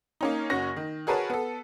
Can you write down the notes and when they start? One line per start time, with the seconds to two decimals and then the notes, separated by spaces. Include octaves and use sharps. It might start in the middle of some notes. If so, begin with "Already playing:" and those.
0.21 A#3 C#4 D#4
0.50 F#1 C#4 F#4 C#6 A#6
0.76 D#3
1.07 F#4 G#4 A#4 B4 C#5 A5
1.30 B3 A4